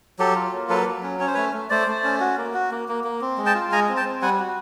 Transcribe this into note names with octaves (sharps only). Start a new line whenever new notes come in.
F#3 G4 A4
F4
A#3
F#3 A4 B4
F#3
C#4
C#4 C#5
C5
A3 B4 C#5
A3
A3 C5 D5
A3
C#4
F#4
A#3
F#4
A#3
A#3
A#3
C4
G#3
G5 A5
F4
G#3 G#5 A#5
C4
G5 A5
C4
G3 F#5 G#5
F#4